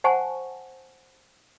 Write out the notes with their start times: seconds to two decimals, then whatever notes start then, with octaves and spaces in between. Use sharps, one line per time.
0.04 C5 F#5 G#5 A5 C#6